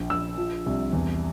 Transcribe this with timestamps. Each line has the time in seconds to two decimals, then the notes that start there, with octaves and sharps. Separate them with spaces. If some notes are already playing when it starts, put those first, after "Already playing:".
Already playing: A#1
0.10 A#1 E6
0.38 F3
0.66 C2
0.93 E2